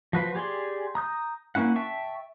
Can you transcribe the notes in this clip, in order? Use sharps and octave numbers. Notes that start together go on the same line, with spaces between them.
F3 F#4 B4 C5
G4 G#4 D5 G#5 C6
A#5 D#6 G6
A#3 C#4 E4 F#5
E5 G5 A5 C#6